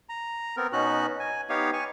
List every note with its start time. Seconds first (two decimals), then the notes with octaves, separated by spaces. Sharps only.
0.09 A#5
0.57 B3 C4 A#4
0.73 B2 C#4 D#4 F#4 F#6
1.20 G#5
1.49 B3 D#4 G4 C#5 F5
1.73 G#5 C#6